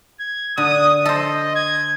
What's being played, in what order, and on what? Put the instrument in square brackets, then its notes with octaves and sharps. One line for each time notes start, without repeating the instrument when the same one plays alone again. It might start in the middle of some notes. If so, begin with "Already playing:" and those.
[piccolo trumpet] G#6
[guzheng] D3 [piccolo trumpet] D#6
[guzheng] A4 C5 [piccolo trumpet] D#5
[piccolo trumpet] G#6